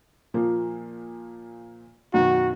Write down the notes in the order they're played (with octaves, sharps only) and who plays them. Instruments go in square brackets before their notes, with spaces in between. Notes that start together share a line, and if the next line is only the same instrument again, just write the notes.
[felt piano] A#2 F3 A#3
[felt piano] F#2 B2 D#3 [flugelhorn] F#4